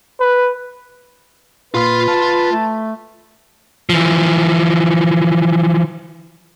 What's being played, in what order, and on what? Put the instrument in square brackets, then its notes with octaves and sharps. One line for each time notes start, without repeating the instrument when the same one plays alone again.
[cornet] B4
[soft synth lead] A#2 [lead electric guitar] F4 C6 [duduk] B4
[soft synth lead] A5
[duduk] A3
[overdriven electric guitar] E3 F3